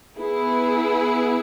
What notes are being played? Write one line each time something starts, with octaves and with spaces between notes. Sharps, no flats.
B3 E4 G#4